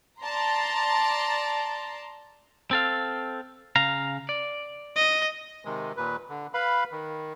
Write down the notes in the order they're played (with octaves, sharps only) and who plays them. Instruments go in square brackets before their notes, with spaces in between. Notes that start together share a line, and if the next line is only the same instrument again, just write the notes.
[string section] D5 A5 A#5 C6
[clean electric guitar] C4 A4 F5
C#3 F5 A#5
D5
[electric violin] D#5
[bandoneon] C3 D#3 G#3
D#2 A#2 B4
D3
B4 F5 B5
D#3